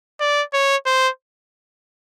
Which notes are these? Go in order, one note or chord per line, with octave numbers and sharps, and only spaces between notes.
D5
C#5
C5